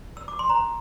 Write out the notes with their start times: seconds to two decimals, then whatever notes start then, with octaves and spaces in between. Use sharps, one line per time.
0.17 E6
0.28 D6
0.39 C6
0.49 C5 A#5